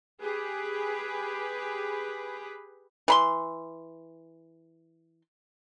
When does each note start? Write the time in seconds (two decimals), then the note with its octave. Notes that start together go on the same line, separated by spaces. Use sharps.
0.22 G4 G#4 B4
3.08 E3 B5 C6